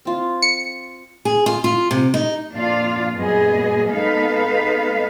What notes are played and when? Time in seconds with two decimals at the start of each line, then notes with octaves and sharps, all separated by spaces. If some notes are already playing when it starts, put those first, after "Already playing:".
0.05 C4 F4
0.42 C#7
1.25 G#4
1.46 F4
1.64 F4
1.91 C3
2.14 D#4
2.52 F2 A#2 D4 F4 F5
3.14 F#2 A#2 G3 B3 G#4 D#5
3.90 G#3 B3 D#4 A4 B4 F5